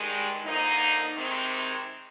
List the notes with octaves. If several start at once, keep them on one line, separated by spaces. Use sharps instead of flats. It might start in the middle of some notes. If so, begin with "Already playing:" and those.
Already playing: G2 D#3 G#3
D3 F3 A#3 D#4
C3 D#3 G#3 C4